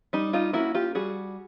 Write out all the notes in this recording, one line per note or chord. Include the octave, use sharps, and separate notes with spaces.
G3 D#4
D#4 F4
A#3 C#4 E4 F#4
F4 G4
G3 F#4 G#4